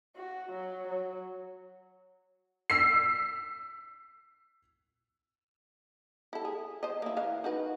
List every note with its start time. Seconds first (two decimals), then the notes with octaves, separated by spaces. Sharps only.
0.17 F#4
0.52 F#3
0.88 F#3
2.70 E6 B6 C7
6.33 E4 A4
6.45 G#4
6.83 C5 D#5
7.02 A#3 E4
7.17 E3 F5
7.44 D#4 F#4 B4